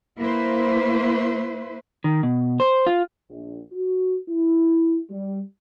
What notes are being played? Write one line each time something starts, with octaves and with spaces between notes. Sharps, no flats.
A#3 E4 B4 C5
D#3
B2
C5
F4
A#1
F#4
E4
G3